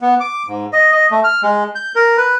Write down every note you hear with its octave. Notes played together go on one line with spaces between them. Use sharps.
B3
D6
G#2
D#5
D#5
A3
F6
G#3
G6
A#4
B4